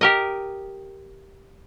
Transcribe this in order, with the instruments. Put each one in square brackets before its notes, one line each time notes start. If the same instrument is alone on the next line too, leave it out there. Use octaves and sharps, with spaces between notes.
[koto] G4 A#4 D#5